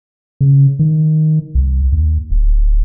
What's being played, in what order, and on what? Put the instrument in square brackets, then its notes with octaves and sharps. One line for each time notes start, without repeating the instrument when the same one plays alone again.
[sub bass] C#3
D#3
C2
D#2
D1